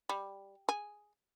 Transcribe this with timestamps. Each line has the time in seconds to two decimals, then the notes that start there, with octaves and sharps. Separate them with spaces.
0.09 G3
0.69 G#4